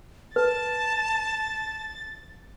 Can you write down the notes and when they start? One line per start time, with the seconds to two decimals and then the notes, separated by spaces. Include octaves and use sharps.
0.36 B4 A5 A6